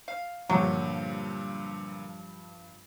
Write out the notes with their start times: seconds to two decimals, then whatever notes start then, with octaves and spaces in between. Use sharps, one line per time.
0.08 F5
0.50 G2 A#2 D3 F3 F#3